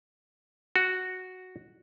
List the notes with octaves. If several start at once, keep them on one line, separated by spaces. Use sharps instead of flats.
F#4